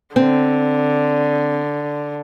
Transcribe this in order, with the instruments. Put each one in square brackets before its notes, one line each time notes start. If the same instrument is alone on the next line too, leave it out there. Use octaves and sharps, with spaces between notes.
[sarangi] D3 [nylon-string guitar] C4